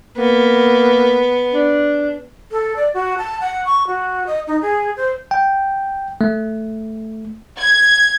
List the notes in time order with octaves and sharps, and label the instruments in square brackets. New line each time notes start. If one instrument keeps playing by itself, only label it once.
[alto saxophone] A#3 [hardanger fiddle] B3
[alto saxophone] D4
[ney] A4
D5
F#4
A5
F#5
C#6
F#4
D#5
D#4
G#4
C5
[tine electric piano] G5
A3
[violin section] G#6